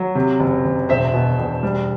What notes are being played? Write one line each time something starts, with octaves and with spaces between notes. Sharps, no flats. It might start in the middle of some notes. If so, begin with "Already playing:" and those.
Already playing: F#3
C3
F#1
F#1
E1 C5 E5
B2
E1
G3